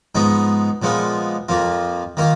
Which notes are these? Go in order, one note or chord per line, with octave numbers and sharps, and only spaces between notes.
G#2 F3 B3 D#4
A#2 F3 G#3 B3 F4
F2 F3 A#3 F4
D#3 A#3 F4